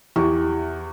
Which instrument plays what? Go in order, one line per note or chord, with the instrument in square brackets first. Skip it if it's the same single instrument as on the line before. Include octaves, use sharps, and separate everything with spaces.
[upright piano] E2 [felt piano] E4 G4 C#6